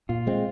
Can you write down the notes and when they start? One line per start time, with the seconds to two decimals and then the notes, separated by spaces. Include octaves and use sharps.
0.09 A#2 F4
0.27 G#3 C4